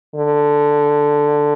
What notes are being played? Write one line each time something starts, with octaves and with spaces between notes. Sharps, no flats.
D3